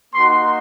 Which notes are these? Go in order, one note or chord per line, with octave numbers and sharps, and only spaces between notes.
A#3 D#4 F#4 C6